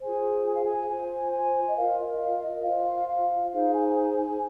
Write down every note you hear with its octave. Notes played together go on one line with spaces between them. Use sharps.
F4 G#4 C5 G#5
G#5
F5
G#5
F4 C5 G#5
G#5
D#5
F4 A#4 F5
D#5
F5
D#5
F4 C5 F5
F5
D#4 G#4 C5 F5
G#5
G#5
G#5